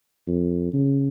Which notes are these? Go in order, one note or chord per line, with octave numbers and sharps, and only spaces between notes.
F2
C#3